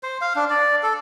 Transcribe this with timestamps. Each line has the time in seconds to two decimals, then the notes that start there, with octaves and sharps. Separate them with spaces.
0.03 C5
0.21 F5
0.36 D4
0.50 D5
0.83 A4